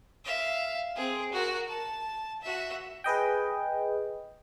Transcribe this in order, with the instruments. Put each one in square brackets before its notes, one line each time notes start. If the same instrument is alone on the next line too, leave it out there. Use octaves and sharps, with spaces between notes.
[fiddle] E5 F5
C4 G#4
F#4 A#4
A5
F#4 E5
[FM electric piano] G#4 B4 D#5 G5